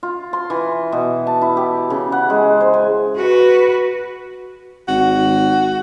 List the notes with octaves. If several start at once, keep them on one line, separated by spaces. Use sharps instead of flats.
F4
C6
E3
B2
A5
E4
G4
C#3
F#5
G#3
C5
G#5
F#4 B4
G#1 F#4